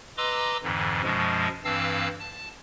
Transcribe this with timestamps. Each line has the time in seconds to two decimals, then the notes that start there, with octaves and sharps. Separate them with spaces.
0.17 B4 D#5 A#5 C6 D6 E6
0.63 F2 G#2 D3 E3
1.03 F#2 B2 F3 G#3
1.65 G2 E3 C4 F5 A5 E6
2.19 A5